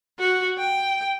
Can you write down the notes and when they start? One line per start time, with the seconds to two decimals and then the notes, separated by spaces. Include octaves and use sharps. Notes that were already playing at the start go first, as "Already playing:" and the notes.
0.19 F#4
0.58 G5